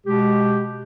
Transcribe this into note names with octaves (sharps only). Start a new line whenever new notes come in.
B2 G#3 G4